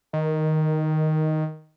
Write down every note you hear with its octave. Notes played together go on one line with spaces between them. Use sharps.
D#3